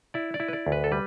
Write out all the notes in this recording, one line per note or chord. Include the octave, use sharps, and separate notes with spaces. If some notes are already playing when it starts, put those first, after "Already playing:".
E4 D5
D5
E4
B4
D5
D2
B4
A4
G3 B4